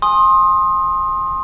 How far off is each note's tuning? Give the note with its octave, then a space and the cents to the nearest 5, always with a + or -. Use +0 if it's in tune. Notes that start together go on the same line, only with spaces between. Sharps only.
G#5 +0 C6 +25 D#6 +0